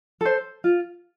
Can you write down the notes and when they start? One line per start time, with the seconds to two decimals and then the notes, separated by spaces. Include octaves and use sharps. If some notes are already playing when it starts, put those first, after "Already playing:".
0.21 A4 C5
0.64 F4